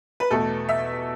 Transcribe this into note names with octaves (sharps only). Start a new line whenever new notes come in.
B4
E2 B2 A3 A4
E5